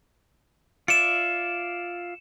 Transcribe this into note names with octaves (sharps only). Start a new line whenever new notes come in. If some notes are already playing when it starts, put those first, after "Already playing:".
F4 D5 E5 C#7 E7